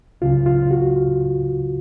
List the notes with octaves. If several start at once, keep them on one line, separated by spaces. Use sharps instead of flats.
C#2 C#3 F#3 F4
F4
F#4